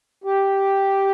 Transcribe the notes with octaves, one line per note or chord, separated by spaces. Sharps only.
G4